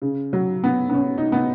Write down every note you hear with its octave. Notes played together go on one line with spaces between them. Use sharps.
C#3
F#3
B3
B3
C#4
D#4
B3